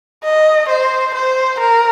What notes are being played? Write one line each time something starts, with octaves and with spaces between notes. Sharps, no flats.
D#5
C5
C5
A#4